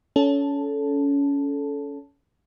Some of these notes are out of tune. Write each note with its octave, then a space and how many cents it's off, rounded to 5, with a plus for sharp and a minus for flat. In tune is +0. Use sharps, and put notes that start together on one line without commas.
C#4 +25 A4 -15 A5 +0